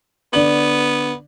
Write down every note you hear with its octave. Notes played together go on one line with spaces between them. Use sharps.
D3 B3 D5 F#7